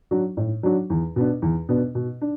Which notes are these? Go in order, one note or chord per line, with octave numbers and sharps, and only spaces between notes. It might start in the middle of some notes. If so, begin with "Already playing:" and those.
F#3 D4 F#4
A2
F#3 D4 F#4
E2
B2 B3 D4
E2
B2 B3 D4
B2
D4